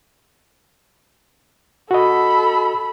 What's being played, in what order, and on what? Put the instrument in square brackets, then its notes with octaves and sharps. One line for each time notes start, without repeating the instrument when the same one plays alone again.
[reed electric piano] F#4 D#5 [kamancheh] A4 B5